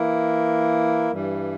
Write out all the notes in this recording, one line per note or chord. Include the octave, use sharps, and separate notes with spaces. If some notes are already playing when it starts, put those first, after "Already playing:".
Already playing: E3 A#3 E4 A#4
G2 E3 G3